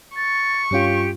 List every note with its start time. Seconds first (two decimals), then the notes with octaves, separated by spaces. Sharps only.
0.16 C#6 A6
0.71 G2 C#4 F4 G4